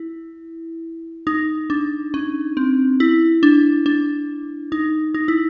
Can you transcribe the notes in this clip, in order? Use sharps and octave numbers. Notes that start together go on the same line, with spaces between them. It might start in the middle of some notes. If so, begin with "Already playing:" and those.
Already playing: E4
D#4
D4
C#4
C4
E4
D4
D4
D#4
D#4
E4